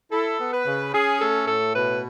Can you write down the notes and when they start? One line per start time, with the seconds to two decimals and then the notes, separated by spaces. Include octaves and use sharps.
0.12 E4 A4
0.39 B3
0.53 B4
0.66 C#3
0.93 C#4 G#4
1.21 A3 A4
1.48 A2 A4
1.76 B2 B4